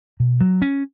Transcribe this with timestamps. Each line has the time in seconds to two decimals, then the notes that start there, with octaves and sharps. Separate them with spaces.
0.20 B2
0.41 F#3
0.62 C#4